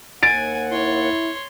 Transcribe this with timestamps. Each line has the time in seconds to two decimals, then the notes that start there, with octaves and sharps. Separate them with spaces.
0.23 D#2 F#5 G#5 A6 D7
0.71 E4 C#5 C6